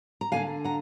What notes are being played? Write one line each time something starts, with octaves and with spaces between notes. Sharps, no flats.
A#5
D3 F3 A#3 D4 F5 G#5
F#5 A#5